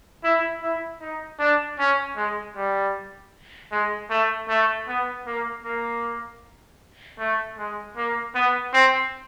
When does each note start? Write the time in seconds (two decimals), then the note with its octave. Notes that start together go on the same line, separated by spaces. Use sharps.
0.24 E4
0.62 E4
1.01 D#4
1.39 D4
1.79 C#4
2.16 G#3
2.56 G3
3.71 G#3
4.10 A3
4.49 A3
4.88 B3
5.27 A#3
5.64 A#3
7.19 A3
7.58 G#3
7.97 A#3
8.35 B3
8.73 C4